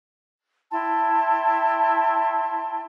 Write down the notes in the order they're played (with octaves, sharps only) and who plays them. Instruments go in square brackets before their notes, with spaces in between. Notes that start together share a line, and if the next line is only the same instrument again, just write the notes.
[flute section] E4 G5 A5 C6